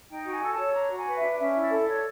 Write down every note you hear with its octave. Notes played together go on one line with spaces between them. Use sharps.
D#4 G5
F#4
G#5
A4
A5
C#5
D4 A#5
F#4
G#5
B4
E5
D4
C#4 E5
E4
D5
A4
D5
C#5